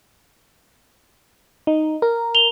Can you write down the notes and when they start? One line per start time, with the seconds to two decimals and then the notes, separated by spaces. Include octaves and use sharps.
1.67 D#4
2.02 A#4
2.35 F7 G7